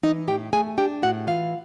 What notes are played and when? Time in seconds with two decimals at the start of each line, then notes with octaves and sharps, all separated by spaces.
0.03 E3 D#4 D#5
0.28 A2 G4 G5
0.53 A3 G#4 G#5
0.78 D4 G4 G5
1.02 A2 F#4 F#5
1.27 E3 F4 F5